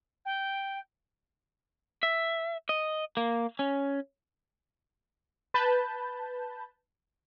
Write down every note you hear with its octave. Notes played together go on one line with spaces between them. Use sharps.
G5
E5
D#5
A#3
C#4
B4 A5 B5 G6